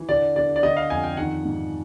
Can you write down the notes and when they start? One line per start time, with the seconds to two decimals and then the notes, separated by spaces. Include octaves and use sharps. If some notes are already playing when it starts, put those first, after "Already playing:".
Already playing: E3
0.09 D3 D5
0.36 D3 D5
0.56 D5
0.63 D3 D#5
0.77 F5
0.90 F2 G#5
1.03 G5
1.17 D#3 F#5
1.45 G#2